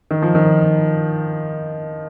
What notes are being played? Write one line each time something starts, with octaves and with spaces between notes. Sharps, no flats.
D#3
F3
D#3